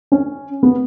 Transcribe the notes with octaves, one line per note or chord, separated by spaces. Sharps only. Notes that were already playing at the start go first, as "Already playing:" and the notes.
C#4
B3